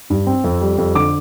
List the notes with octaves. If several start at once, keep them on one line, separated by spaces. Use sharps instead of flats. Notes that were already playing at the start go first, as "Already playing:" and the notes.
G2
C4
F2
G3
F2
D3 D6